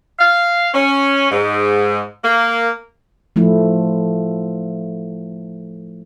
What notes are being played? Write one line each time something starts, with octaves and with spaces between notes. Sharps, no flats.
F5
C#4
G#2
A#3
F3 A3 E4